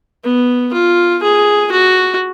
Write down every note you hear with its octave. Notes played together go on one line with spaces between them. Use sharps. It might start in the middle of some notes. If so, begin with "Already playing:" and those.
B3
F4
G#4
F#4